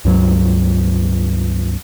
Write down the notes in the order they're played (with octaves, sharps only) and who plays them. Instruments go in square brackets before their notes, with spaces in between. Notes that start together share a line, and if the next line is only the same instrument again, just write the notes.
[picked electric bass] C#2 G2 F#3